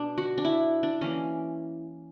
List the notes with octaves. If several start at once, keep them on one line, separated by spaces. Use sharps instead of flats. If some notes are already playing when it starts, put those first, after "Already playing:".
Already playing: B2 D4
F#4
D4
E4
D4
E3 A#3 C#4